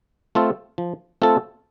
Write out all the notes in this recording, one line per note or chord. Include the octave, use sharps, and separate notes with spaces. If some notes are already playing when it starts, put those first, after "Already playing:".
A3 C4 F4 A4
F3
A3 C4 F4 A4